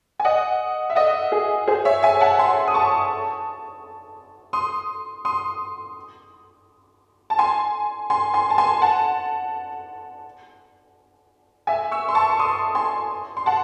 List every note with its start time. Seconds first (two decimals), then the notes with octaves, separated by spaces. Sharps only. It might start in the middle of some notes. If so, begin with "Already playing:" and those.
0.20 G#5
0.25 D#5 F#5
0.90 E5
0.95 D#5 F#5
1.32 G#4
1.68 G#4 C5
1.85 C#5 E5
2.03 E5 G#5
2.20 F#5 A5
2.39 G#5 C6
2.68 D#6
2.74 A5 C#6
4.53 C6 D#6
5.25 C6 D#6
7.30 A5
7.39 G#5 C6
8.10 G#5 C6
8.34 G#5 C6
8.50 A5
8.58 G#5 C6
8.82 F#5 A5
11.67 E5 G#5
11.91 C#6 E6
12.08 C6
12.15 A5 C#6
12.30 C#6
12.39 C6 D#6
12.75 G#5 C6
13.37 C6
13.46 F#5 A5